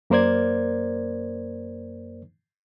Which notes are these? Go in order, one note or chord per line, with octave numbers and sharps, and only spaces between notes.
F#2 A#3 A#4 C5 D5 G#6